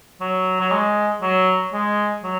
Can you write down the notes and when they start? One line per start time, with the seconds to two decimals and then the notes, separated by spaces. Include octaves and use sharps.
0.20 F#3
0.61 F#3
0.72 G#3
1.22 F#3
1.73 G#3
2.23 F#3